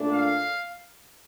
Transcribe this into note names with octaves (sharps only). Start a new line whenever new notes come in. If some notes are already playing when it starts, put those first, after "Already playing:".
Already playing: A#2 A3 D4
F5